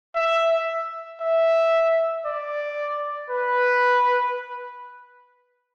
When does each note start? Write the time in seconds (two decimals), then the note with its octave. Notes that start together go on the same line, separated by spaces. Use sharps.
0.15 E5
1.21 E5
2.25 D5
3.30 B4